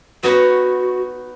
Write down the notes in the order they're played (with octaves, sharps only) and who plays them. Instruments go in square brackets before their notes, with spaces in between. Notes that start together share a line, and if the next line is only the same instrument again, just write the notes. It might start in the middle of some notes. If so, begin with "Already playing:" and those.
[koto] B3 D#4 C#5 [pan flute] F#4